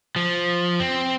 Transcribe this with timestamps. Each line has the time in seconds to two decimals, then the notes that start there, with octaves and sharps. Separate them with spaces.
0.16 F3
0.80 C4